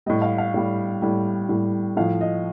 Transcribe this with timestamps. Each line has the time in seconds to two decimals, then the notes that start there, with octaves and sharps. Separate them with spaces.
0.06 A2 G3 D#5
0.22 F5
0.38 F5
0.54 A2 G3
1.02 A2 G3
1.49 A2 G3
1.97 A2 F3 F5
2.21 D#5